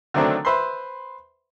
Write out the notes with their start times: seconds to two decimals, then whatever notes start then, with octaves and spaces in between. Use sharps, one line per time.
0.14 D3 D#3 F#3 A3 C4 D4
0.45 B4 C5 E5 B5 C6